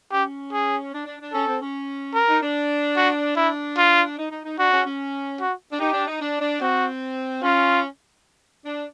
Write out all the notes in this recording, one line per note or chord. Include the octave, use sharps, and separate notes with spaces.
C#4 G4
G#4
D4
D4
D4
C#4 A4
C4
C#4
A#4
D#4
D4
F#4
D4 E4
F4
D#4
D#4
D#4
D4 F#4
C#4
C#4
F#4
D4
D#4 G4
D4
D#4
D4
D4
C4 F#4
C#4 F4
D4